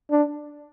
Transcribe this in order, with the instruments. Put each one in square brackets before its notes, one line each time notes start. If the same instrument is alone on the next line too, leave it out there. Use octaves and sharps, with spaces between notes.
[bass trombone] D4